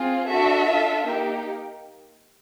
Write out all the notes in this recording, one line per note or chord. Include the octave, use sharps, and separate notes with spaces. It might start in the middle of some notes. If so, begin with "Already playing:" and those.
Already playing: C4 F4 G#4
D4 F#4 A4 E5
D4 F4 A4
A#3 D#4 G4